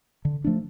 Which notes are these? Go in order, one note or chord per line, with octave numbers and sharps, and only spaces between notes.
D3
F3 A3 D4